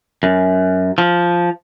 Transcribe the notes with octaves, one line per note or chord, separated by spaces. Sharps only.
F#2
F3